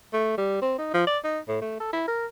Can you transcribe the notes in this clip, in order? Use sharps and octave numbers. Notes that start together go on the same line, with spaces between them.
A3
G3
C4
D#4
F3
D5
D#4
A2
A3
A4
E4
A#4